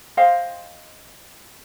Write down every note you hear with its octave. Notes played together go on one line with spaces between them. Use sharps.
C5 D#5 F5 G5